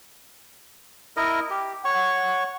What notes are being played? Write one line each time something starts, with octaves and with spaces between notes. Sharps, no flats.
E4 A#4 D#5
G4
C#5 F#5 C#6